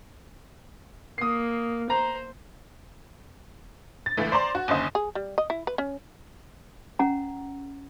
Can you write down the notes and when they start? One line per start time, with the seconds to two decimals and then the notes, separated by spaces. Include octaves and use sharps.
1.18 A#3 D#6 C7
1.90 C5 A#5
4.06 A6
4.17 C#2 E3 A3
4.32 C5 D5 A#5 C6
4.55 F#4
4.68 F#1 D#2 D3 C#4 C5 D#5
4.95 G#4
5.15 G3
5.38 D#5
5.50 E4
5.67 B4
5.78 C#4
6.99 C#4 F#5 A#5